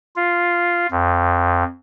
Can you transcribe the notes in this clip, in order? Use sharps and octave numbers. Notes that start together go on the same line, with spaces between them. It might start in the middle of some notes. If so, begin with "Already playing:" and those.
F4
F2